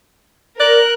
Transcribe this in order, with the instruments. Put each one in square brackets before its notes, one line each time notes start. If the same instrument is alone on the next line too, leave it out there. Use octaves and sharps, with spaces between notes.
[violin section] A#4 [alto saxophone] D5 [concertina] F#6